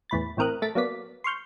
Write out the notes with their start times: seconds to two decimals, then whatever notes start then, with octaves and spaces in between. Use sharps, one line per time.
0.10 E2 A2 B5 A6
0.37 A1 A2 C4 A#4 D#6 F#6
0.62 A3 A5 A6 B6 D7
0.75 F#3 A#3 B3 D5 B6
1.24 C6 C#6 F6 G6